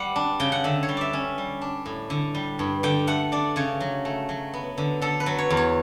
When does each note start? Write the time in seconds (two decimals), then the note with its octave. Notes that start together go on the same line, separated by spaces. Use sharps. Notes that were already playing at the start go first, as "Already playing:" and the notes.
Already playing: G3 F#5
0.16 D4
0.40 C#3 G5
0.52 F#5
0.64 D3 E5
0.83 C#5
0.89 G3
0.97 D5 E5
1.13 C#4
1.38 G3
1.61 D4
1.86 A2
2.10 D3
2.35 G3
2.59 G2
2.83 D3 G5
3.07 A3 F#5
3.32 D4 D5
3.56 C#3 C#5
3.80 F#3
4.05 A3
4.29 F#3
4.53 B3
4.78 D3
5.02 D3 A4
5.20 B4
5.26 F#3
5.38 C#5
5.50 E2
5.57 C#5